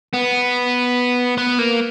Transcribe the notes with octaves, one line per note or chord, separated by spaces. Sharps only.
B3
B3
A#3